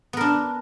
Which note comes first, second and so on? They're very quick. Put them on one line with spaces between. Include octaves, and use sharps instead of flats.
B3 A#4 D4